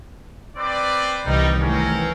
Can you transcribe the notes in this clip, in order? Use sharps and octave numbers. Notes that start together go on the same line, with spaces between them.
C4 B4 D5
C2 D#3 E3 G3 D#4
E3 A3 C4 C#4 A#4